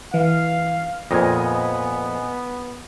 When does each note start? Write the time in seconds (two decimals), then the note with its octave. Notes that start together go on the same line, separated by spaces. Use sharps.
0.14 E3 F5
1.11 F2 A#2 B3 D#5 G#5